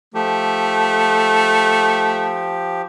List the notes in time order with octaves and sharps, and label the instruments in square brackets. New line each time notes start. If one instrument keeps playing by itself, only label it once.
[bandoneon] F3 G4 [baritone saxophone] A3